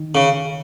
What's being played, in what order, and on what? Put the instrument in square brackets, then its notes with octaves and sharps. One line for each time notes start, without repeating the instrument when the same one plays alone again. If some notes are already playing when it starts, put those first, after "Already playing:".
Already playing: [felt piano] D#3
[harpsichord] C#3